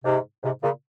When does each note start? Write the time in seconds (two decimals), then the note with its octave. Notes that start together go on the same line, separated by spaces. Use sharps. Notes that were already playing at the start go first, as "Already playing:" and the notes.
0.04 G#2 C3
0.43 G#2 C3
0.62 A#2 C#3